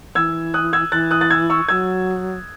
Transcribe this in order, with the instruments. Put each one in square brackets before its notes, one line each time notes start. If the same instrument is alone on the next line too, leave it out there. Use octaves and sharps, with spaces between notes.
[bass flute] E3 [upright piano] E6 G#6
[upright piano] D#6 F#6
E6 G#6
[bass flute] E3 [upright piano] F#6 A6
[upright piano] D#6 F#6
F#6 A6
E6 G#6
C#6 E6
[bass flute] F#3 [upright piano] E6 G#6